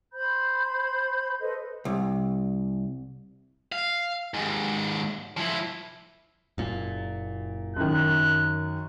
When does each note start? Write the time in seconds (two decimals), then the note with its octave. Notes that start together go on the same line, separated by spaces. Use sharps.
0.13 C5 B5 G6
1.40 A4 B4 C5 D#5
1.85 C2
3.72 F5
4.34 D#2 G#2
5.37 F3 E4
6.58 F#1 A#2
7.76 F#2 D#3 F#6